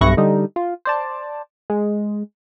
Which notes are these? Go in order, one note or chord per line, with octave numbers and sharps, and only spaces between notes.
B1 G2 E4 C#6 F#6 A#6
D3 G3 D#4
F4
C5 D5 A5
G#3